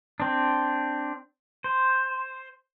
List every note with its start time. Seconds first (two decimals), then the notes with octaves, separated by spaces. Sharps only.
0.20 C4 D4
1.64 C5